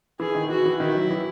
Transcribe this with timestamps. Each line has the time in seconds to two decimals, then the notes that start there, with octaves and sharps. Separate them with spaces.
0.20 E3 G#4
0.35 D#3
0.50 E3 F#4
0.65 E3
0.80 D#3 E4
0.95 F#3
1.11 E3